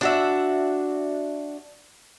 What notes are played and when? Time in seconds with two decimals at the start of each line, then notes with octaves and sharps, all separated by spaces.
0.01 D4 F#4 E5